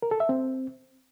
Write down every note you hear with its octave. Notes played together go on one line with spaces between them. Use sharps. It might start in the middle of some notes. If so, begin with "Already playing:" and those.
A#4
A4
E5
C4